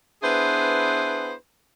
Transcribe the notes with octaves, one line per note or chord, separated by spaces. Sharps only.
B3 D4 E4 G#4 B4 C5